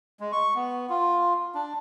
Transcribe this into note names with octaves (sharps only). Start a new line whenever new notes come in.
G#3
C#6
B3
F4
D4